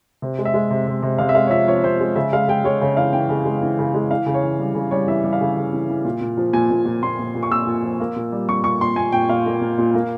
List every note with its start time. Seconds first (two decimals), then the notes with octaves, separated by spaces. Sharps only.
0.22 C3
0.39 G#3
0.45 E5
0.54 G#3
0.70 C3
0.87 C3
1.03 C3
1.18 C3 F5
1.29 E5
1.35 G#3 F5
1.47 C#5
1.51 F3 E5
1.67 F3 C#5
1.84 C3 C5
2.00 G#3
2.16 C#3 E5
2.33 G#3 F5
2.48 G#3 G5
2.64 G#3 C#5
2.81 C#3 C#5
2.97 E3 F5
3.13 E3 G5
3.29 C#3
3.45 G#3
3.62 E3
3.79 C#3
3.94 G#3
4.11 E3 F5
4.26 C#3
4.34 C#5
4.43 E3
4.59 G3
4.75 C#3
4.91 G3 C#5
5.07 E3 E5
5.24 G3
5.33 F5
5.41 C#3
5.57 C#3
5.73 E3
5.90 E3
6.05 A#2
6.21 A#2
6.38 F3
6.53 A#2 G#5
6.71 A#2
6.86 A#2
7.02 A#2 C6
7.19 A#2
7.35 A#2
7.43 C#6
7.51 A#2 E6
7.67 A#2
7.84 F3
8.00 A#3
8.16 A#2
8.32 G3
8.49 G3 C#6
8.64 A#2 C#6
8.81 A#2 C6
8.96 A#2 G#5
9.12 A#2 G5
9.29 A#2 F5
9.46 A#3
9.61 A#2
9.78 A#2
9.95 A#3